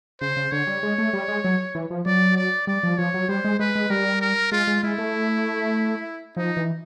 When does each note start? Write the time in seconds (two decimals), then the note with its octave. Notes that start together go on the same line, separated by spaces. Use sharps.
0.21 C#3 C5
0.37 C#3
0.52 D3 C#5
0.67 G3
0.83 G#3
0.98 A3
1.13 G3
1.28 G#3
1.44 F#3
1.75 E3
1.91 F3
2.06 F#3 D5
2.37 D5
2.67 G3 D5
2.83 F3
2.98 F3 C#5
3.14 F#3
3.29 G3 C5
3.45 G#3
3.59 G#3 B4
3.75 G#3
3.90 G3 A#4
4.21 A#4
4.52 G#3 F4
4.67 G#3
4.83 G#3 E4
4.98 A3
6.37 F3 D#4
6.57 E3